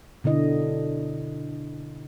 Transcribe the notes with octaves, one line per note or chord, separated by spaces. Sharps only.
B2 D3 E4 D#5